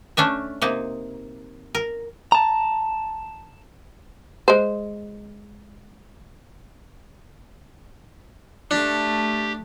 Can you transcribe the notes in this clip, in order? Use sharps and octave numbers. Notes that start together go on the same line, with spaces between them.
A3 C#4 D4 E5
C3 A#3 D#4
A#4
A5 A#5
G#3 C5
A3 D4 G4